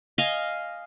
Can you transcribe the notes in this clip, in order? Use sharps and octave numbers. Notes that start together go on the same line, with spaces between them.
D#5 F5 G#5